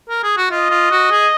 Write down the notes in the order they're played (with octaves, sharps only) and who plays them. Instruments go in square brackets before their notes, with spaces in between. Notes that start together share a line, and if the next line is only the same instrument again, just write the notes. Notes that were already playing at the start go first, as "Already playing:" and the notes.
[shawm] A#4
G#4
F#4
[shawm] F4 [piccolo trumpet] D#5
[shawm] F4
F#4
G#4